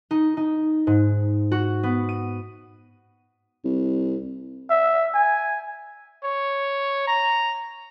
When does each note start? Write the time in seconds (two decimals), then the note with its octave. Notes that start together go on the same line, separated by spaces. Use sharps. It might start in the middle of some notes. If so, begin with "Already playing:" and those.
0.11 D#4
0.37 D#4
0.87 G#2
1.51 F#4
1.83 B3
2.09 D#7
3.65 C2
4.70 E5
5.14 G#5
6.24 C#5
7.07 A#5